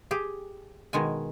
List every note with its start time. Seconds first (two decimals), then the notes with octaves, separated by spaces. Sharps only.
0.11 G4 G#4
0.93 B2 D#3 G#3 G#5